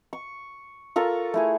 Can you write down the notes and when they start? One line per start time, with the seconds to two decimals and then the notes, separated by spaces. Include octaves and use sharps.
0.13 C#6
0.96 F4 A4 A#4 C#6
1.34 A3 E4 G#4